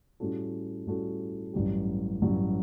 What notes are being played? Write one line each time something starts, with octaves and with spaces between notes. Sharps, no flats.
A2 G3 C#4 F#4 A4
A2 G3 C#4 F#4 A4
A1 G2 F#3 C#4 G4
A1 G2 F#3 C#4 G4